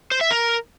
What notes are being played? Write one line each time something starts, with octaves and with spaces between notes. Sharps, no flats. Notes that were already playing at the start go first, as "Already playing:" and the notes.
C5
E5
A#4